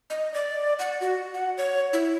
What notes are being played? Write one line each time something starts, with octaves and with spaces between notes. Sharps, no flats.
D#5
D5
F#5
F#4
F#5
C#5
E4